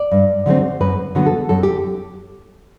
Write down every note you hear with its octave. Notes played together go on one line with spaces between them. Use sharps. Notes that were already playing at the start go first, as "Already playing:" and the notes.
Already playing: D5
G2
D3 F#3 A3 C4
F#2 B4
D3 F#3 B3
A4
F#2 A4
G4